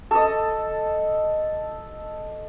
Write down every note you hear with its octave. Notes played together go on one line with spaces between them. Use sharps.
A4 D#5